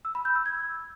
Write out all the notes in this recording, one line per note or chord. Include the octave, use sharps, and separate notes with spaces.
E6
B5
G6
E6
G#6